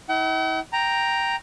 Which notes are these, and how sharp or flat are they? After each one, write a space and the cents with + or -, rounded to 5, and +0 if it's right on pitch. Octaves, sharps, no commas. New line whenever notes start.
E4 -45 F#5 +45
G5 +0 A#5 +0